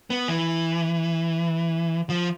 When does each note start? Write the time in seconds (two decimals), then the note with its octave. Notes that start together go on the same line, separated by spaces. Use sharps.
0.10 B3
0.28 E3
2.10 F3